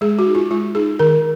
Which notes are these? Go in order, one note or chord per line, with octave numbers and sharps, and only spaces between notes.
G#3 G#4
F#4
D#4
F4
G#3 F4
D#4 G#4
D#3 A#4